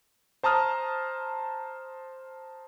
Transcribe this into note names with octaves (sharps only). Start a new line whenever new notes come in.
C5 A5 A#5 D#6 F6